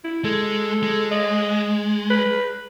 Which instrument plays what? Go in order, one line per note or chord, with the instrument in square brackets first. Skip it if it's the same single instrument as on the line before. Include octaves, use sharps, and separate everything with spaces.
[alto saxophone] E4
[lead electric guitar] G#3 [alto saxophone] A4
[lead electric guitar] G#3
[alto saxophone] D#5
B4